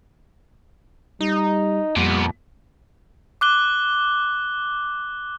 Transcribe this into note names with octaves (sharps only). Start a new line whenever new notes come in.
G3 D#4
F2 A#2 G3 B3
D6 F#6 G7